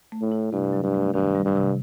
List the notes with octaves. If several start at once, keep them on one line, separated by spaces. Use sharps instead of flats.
A3
A2
E4
G2 C3
F#3
G2
A3
G2 D#3
G3
G2
C3